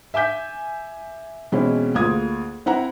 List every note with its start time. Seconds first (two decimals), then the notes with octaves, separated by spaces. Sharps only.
0.14 E5 G#5 D6 G6 B6
1.52 B2 E3 G#3 C4 C#4 E4
1.95 D2 A#3 F4 G#4 D#6 G#6
2.66 C4 E4 F#5 A#5